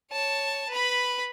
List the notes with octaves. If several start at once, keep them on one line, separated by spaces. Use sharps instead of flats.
C#5 A5
B4 B5